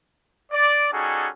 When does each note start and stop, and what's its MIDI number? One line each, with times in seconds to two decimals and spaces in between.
0.52 0.88 74
0.93 1.29 55
0.93 1.29 61
0.93 1.29 63
0.93 1.29 66
0.93 1.29 68
0.93 1.29 69